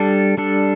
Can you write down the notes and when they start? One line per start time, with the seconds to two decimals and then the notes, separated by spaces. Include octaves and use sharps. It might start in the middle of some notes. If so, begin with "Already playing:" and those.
Already playing: G3 D4 A4
0.37 G3 D4 A4